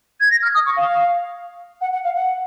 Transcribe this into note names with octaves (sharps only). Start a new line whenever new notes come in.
G#6
A#6
F6
D#6
C#6
F5
F#5
F#5
F5
F#5